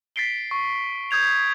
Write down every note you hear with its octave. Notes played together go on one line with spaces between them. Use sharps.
A6 B6 C7 D7 G7
C#6
D#6 G6 G#6 F7